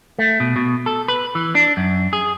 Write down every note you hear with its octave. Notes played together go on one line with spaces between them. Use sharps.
A3
B2
B2
A4
B4
E3
D4
F#2
G#4